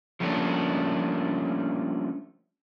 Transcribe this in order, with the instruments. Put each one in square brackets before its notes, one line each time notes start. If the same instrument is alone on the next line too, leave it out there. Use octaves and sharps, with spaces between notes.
[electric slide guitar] F3 G3 A3 A#3 C#4 D4